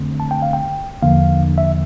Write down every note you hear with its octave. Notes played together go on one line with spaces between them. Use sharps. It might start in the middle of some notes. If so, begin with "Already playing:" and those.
Already playing: F2 D3 A3 C4
A5
G5
F5
G5
E2 D3 F3 A#3 D4 F5
E5